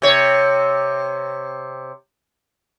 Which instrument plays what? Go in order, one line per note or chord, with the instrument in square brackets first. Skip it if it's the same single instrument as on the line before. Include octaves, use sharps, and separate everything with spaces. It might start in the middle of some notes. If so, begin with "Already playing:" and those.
[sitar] C3 C#5